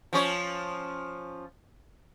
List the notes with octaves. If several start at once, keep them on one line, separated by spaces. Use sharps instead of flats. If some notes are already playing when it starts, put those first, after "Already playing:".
F3 C#4 C#5